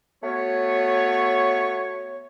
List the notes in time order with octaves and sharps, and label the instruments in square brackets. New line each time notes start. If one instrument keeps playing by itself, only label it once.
[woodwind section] A3 B3 F#4 C#5